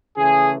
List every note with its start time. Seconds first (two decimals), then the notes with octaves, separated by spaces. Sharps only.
0.17 C#3 E3 A3 G#4